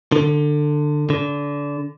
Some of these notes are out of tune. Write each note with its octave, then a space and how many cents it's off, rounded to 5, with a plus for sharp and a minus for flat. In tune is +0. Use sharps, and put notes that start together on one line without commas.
D3 +20
D3 -25